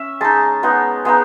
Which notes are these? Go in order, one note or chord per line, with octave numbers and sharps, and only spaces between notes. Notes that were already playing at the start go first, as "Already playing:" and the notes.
Already playing: C#4 E5
G#3 D#4 A5
G#3 B3 D#4
G#3 B3 D#4